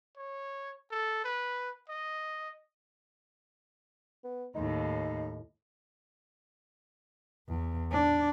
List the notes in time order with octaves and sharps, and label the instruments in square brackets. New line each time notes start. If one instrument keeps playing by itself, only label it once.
[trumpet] C#5
A4
B4
D#5
[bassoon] B3
[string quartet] D#2 A2 [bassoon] D#4
[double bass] E2
D4